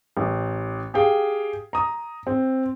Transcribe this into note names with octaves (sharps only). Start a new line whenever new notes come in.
A1
G4 G#4 F5 G5
A#5 D#6
C4